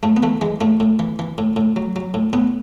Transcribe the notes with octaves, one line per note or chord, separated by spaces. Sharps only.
A2 A3
B3
E3 A3
E3 G#3
A2 A3
A2
E3
E3
A2
A2
F#3
F#3
A2
A2 B3